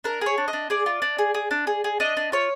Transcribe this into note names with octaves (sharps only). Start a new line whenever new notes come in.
D4 A#4
G#4 C#5
D4
D#5
D4
G#4 D5
F4
D4
G#4
G#4
D4
G#4
G#4
D4 D#5
D4
F4 C#5